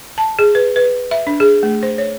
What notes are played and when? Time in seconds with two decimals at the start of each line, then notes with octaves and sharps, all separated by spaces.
0.18 A5
0.39 G#4
0.55 B4
0.76 B4
1.11 E5
1.27 D4
1.40 G#4
1.63 A3
1.83 C5
1.98 C#5